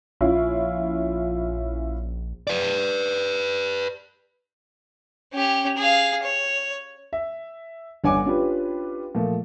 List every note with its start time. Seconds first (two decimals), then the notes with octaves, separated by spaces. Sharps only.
0.21 A#1 C#4 E4 F4
2.47 B4 D5
5.34 C#4 G4
5.78 G#4 F5
6.23 C#5
7.13 E5
8.04 G1 D4 C#5 F#5 G#5 D6
8.26 C#4 D4 F4 G4 B4
9.15 A#2 F3 A3